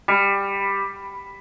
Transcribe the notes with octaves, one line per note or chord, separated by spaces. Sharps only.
G3